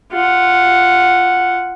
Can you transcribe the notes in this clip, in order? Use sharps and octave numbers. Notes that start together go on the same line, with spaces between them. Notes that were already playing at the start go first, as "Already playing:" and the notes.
F4 F#5